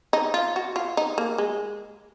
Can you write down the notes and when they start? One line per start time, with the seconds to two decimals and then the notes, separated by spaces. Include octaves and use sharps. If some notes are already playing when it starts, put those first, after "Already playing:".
0.13 D#4
0.34 F4
0.56 F#4
0.76 F4
0.97 D#4
1.18 A#3
1.38 G#3